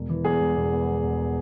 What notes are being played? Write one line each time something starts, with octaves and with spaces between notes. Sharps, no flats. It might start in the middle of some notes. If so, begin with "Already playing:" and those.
Already playing: E1
E3
E2 G#4
E1
E1
B3
E1
E1